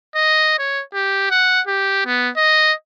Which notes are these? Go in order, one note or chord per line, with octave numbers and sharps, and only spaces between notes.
D#5
C#5
G4
F#5
G4
B3
D#5